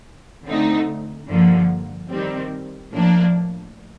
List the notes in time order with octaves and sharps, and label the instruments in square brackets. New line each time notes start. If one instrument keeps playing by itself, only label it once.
[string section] D3 A3 C4 D#4
G2 D3 F3 A#3
D#3 G3 C4
A2 F3 A#3 D4